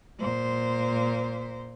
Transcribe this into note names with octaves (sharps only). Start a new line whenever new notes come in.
A#2 C5